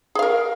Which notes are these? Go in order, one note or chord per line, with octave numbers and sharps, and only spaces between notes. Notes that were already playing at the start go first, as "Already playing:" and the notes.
G#4 A#4 F5